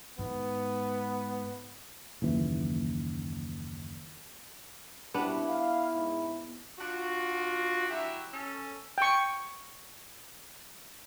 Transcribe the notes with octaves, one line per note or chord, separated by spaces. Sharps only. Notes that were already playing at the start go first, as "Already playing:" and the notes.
G#2 B3
F#1 D#2 E3
B2 G3 B3 C4 D4 E4
F5
G#2
D4 F4 F#4
F#3 E4 F#4 G4 E5
C#4 A4
G5 C#6